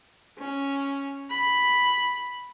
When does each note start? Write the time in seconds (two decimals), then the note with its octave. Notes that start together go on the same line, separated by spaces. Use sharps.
0.39 C#4
1.31 B5